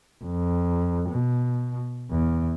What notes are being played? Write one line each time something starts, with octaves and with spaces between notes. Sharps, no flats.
F2
B2
E2